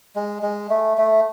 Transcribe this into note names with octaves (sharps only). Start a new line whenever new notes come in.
G#3
G#3
A3
A3